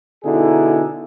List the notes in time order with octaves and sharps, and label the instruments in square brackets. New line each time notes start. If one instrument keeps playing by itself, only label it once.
[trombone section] B2 D3 D#4 E4 G#4